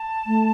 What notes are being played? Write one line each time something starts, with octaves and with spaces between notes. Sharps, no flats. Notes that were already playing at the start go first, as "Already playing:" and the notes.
Already playing: A5
A3